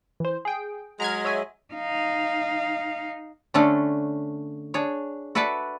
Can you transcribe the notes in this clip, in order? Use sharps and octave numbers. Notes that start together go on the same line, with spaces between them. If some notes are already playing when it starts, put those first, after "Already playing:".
E3 C5
G#4 G5
F#3 G#3 A#5 F6 G#6
C#5 E5 G#5
D#4 F5
D3 A3 C#4 D4 A4
D4 G#4 C#5
F#4 A4 B4 D5 E5 A5